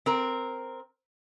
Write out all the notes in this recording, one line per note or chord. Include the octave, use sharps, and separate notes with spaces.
C4 A#4